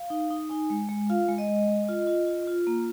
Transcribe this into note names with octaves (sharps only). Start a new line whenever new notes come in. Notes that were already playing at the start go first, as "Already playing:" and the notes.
Already playing: F5
D#4
D#4
D#4 G#5
G#3
G#3
F4 F5
G#3
D#5
G#3
G#3
F4
F4
F4
F4
A#3